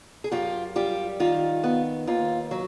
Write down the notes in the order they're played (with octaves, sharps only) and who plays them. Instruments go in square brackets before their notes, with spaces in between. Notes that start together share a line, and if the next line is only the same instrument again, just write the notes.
[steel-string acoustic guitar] G#4
F#2 F4 G4
G3 F4 G4
D#3 F4
B3
D#2 F4
F#3